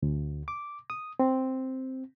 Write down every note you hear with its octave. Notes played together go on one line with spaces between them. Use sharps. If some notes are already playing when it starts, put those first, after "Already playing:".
D2
D6
D#6
C4